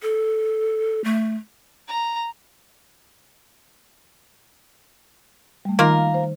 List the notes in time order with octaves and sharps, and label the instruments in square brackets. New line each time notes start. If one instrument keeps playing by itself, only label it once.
[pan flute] A4
A3
[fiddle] A#5
[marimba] G3 A3
[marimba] D#3 D#4 [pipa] A#3 F4 A#4
[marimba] C5